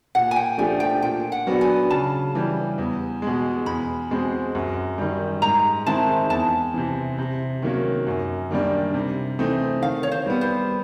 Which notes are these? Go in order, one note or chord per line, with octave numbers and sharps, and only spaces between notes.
A#2 F#5
G#5
G5
F3 A3 D4 G4 G#5
G5
A#2 G5
F#5
F#3 B3 D4 F#4
G#5
C#3 A5
E3 G3
E2
B2 G#3
E2 B5
B2 G#3 C4
F#2
D#3 G3
G#2 A#5
D#3 G#3 C4 E4 A5
E2 A5
C3 E3
C3
D#3 F#3 A#3 C#4
F#2
D#3 G3 A#3 D4
C3
E3 A3 C4 D#4
D#3 F5
C#5
C5
G3 B3
C5